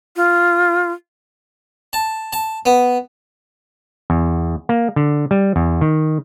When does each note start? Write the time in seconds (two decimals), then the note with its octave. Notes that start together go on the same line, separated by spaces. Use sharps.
0.16 F4
1.93 A5
2.33 A5
2.66 B3
4.10 E2
4.69 A#3
4.96 D3
5.31 G3
5.56 E2
5.81 D#3